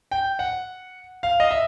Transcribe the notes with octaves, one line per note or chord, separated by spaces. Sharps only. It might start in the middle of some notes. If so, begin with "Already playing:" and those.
G5
F#5
F5
D#5
E5